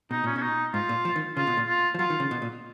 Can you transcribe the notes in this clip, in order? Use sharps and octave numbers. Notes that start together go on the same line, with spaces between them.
B2 D#4
A#2 C#4
B2 C#4
D#4
G#2 F4
A#2
F3
D#3
C#3 F4
B2
A#2
F4
F3
F#3 F4
D#3
C#3
B2
A#2